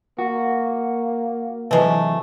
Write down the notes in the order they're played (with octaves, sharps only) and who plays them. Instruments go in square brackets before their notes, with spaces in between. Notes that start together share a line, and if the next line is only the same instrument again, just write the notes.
[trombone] A#3 [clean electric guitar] F#4
[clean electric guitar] C3 E3 F#3 [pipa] G#3 A3 [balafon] B4 A5